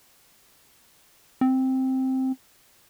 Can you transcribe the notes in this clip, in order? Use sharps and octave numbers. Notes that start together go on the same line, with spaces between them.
C4